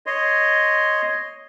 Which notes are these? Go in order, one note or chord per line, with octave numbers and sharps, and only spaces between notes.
C#5 D#5 C6